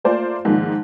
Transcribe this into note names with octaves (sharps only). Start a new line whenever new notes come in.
A3 A#3 F4 C5 D5
G#2 D#3 F3 A#3